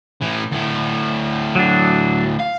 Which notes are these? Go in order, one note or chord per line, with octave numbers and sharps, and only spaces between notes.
A2 E3
D2 A2
F#3 D4
F5